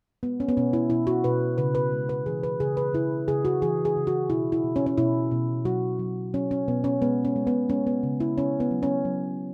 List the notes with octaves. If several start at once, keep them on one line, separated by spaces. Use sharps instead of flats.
G#3 B3
C#4
B3
B2 C#4
E4
B2 E4
F#4
B2 B4
C#3 B4
B4
G#3
B4
E3 G#4
B4
C#3 G#4
B4
C#3 E4
C#3 G#4
F#4
E3 G#4
G#4
C#3
F#4
B2 E4
E4
B2
C#4
C#4
B2 E4
B2
F#3 F#4
F#3
F#3 C#4
C#4
B2 B3
C#4
G#3 B3
C#4
G#3
B3
G#3 C#4
B3
C#3
E4
C#3 C#4
B3
F#3
C#4
F#3